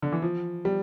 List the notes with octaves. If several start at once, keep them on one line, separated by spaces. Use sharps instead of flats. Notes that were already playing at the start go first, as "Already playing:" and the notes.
D3
E3
F3
G3